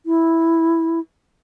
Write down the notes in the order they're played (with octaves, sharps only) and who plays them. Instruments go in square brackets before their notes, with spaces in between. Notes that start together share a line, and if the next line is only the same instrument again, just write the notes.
[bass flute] E4